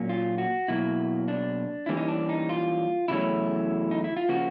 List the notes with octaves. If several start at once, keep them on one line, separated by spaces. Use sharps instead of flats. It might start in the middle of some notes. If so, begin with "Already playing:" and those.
Already playing: A#2 F#3 A#3 C#4
F4
F#4
B2 F#3 A#3 E4
D4
A2 E3 G3 A#3 C#4 E4
D#4
D4
D#4
F4
E2 C#3 F#3 A3 C#4 E4
D#4
E4
F4
C#3 F3 A#3 F#4